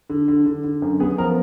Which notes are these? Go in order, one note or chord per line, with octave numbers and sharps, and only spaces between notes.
D3
D3
D3
D3
F#2
B3 G#4
F3 A#4